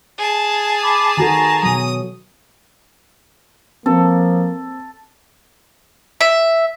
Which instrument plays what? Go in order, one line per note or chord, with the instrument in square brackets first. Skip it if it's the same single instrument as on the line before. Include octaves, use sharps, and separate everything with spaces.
[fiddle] G#4 A5
[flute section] B5 D6
[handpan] D#3 F#4 A4 [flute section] G#5 A#5
[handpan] B2 F#3 [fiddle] D#6
[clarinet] F3 [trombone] A#3 [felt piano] C4 [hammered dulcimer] A4
[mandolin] E5